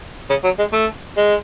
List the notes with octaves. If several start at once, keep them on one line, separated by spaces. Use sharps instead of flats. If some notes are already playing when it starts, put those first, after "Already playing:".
C#3
F#3
G#3
A3
G#3